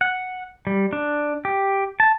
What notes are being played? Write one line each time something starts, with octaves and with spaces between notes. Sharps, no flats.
F#5
G3
D4
G4
A5